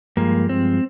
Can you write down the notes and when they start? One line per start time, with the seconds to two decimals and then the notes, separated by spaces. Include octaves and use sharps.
0.17 G2 F3 G#3 A#3
0.49 C4